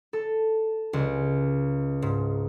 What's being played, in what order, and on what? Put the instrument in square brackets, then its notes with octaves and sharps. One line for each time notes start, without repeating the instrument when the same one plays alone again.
[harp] A4
C#2
G#2